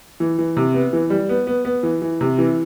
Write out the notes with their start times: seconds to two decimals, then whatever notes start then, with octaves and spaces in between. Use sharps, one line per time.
0.20 E3
0.39 E3
0.57 C3
0.74 B3
0.93 E3
1.10 G3
1.29 B3
1.47 B3
1.65 B3
1.83 E3
2.02 E3
2.21 C3
2.38 E3